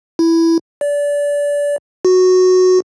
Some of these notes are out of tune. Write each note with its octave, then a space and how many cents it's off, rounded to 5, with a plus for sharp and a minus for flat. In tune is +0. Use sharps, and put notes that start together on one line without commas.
E4 +5
D5 -25
F#4 -5